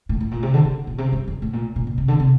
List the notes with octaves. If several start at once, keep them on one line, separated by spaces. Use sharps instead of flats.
A2
A2
A#2
C3
D3
D3
A#2
C3
G2
F2
A2
A#2
A#2
A#2
C3
D3
C3